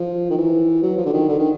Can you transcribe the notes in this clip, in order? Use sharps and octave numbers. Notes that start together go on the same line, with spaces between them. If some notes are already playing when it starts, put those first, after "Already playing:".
Already playing: F3
D#3
E3
F#3
F3
D3
D#3
D3
D#3